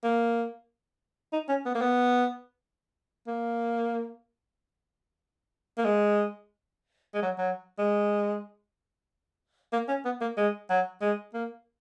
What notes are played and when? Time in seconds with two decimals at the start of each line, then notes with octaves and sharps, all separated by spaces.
0.04 A#3
1.33 D#4
1.49 C#4
1.65 B3
1.75 A#3
1.81 B3
3.27 A#3
5.78 A#3
5.85 G#3
7.14 G#3
7.22 F#3
7.38 F#3
7.79 G#3
9.73 A#3
9.89 C#4
10.05 B3
10.21 A#3
10.37 G#3
10.70 F#3
11.01 G#3
11.34 A#3